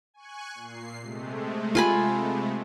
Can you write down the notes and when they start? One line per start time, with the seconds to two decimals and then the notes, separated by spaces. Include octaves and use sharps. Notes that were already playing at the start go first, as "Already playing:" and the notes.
0.14 G#5 C#6 F#6
0.55 A#2 C7
1.01 C3 G#3 A3
1.75 F4 G#5 B5